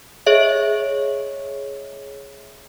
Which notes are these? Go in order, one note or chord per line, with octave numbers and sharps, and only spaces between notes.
G#4 C#5 D#5 E5